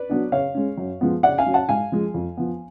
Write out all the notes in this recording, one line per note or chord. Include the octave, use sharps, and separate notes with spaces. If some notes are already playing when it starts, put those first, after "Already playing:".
Already playing: B4 D5
F#3 B3 D4
C#3 C#5 F5
G#3 C#4
F#2
F3 G#3 B3
C#3 D5 F#5
F5 G#5
F#3 C#4
F#5 A5
G#2 F5 G#5
F3 G#3
F2
F3 B3